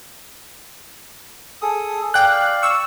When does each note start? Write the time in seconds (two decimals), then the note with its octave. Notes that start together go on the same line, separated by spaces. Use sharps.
1.62 G#4 A4 D#6
2.14 D5 F5 G5 F#6
2.63 C#6 E6